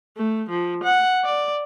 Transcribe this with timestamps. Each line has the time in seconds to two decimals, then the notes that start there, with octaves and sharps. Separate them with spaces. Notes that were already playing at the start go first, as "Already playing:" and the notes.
0.17 A3
0.50 F3
0.83 F#5
1.24 D5